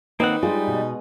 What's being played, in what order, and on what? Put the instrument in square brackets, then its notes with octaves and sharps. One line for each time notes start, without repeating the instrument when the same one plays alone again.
[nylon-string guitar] D#3 [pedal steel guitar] A#3 C4 F#5 [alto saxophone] D#4 [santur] B4 D#5
[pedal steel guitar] G3 [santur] G#3 D#6 [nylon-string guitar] F4
[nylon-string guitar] B2